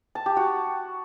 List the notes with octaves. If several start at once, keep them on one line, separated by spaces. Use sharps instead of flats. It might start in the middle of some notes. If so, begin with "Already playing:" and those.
A5
G4
F#4